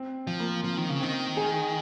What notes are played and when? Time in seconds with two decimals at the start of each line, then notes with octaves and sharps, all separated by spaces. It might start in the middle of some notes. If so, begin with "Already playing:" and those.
Already playing: C4
0.27 F3
0.40 A#3
0.63 F3 C4
0.77 D#3
0.90 C#3
1.01 D#3 C4
1.37 G#4